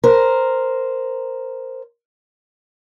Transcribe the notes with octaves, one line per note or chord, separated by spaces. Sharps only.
A#4 C5